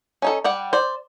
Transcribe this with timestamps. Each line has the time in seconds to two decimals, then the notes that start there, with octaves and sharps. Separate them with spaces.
0.22 C#4 D#4 A4
0.44 G3 D5 F#5
0.73 C5 D5